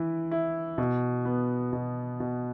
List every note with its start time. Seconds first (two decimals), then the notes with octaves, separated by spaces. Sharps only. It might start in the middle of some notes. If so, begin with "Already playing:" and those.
Already playing: E3 E4
0.31 E4
0.78 B2
1.25 B3
1.73 B2
2.20 B2